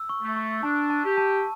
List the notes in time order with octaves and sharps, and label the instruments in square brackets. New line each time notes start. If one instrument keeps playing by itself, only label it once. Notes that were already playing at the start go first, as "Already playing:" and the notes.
Already playing: [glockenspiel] E6
C#6
[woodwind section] A3
[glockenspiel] C#6
[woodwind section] D4 [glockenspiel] A5
[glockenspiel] A5
[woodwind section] G4
[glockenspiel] A5